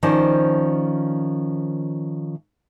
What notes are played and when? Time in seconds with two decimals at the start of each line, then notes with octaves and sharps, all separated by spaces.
0.03 D#3 F3 C#4 C5 D5